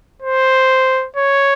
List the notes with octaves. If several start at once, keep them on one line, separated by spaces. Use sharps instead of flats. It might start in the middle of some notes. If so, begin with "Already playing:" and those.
C5
C#5